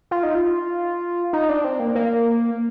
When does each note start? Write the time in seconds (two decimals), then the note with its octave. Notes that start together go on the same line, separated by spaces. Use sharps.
0.11 F4
0.23 D#4
0.35 F4
1.33 D#4
1.49 D4
1.64 C4
1.80 A#3
1.95 A#3